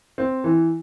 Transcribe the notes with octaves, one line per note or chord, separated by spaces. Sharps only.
C4
E3